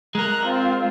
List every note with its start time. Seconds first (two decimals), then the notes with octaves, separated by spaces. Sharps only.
0.15 G#3 A#4 A#5 F#6
0.46 C4 F4